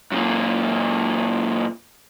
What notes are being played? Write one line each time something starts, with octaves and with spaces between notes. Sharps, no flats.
F#2 A#2